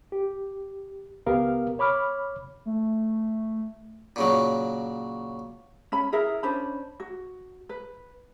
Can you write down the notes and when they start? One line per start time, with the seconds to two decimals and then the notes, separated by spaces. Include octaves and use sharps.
0.12 G4
1.26 C#2 B3 G4 A#4 F5
1.79 C#5 B5 D6 F6
2.66 A3
4.16 A#2 C#3 F#3
5.92 C#4 B5
6.12 E4 G#4 A#4 E5
6.43 C#4 D4 C5 B5
7.00 F#4
7.69 B4